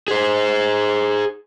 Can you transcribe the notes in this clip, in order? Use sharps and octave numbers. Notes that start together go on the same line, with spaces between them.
G#4 C5